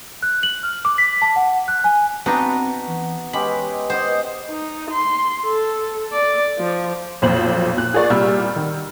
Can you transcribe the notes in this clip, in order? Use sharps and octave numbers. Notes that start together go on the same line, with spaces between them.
F#6
F#7
F6
D6
B6
A5
F#5
F#6
G#5
B3 C4 D4 D#4 F#4
E3
G#3 C#4 G4 B4 B5
B3 C5 D#5
D#4
C6
A4
D5
F3
B1 F2 A#2 C5 F#7
A#2 F#6
F4 G#4 A#4 D5 C#6
C2 A#2 G3 E6 F6
D#3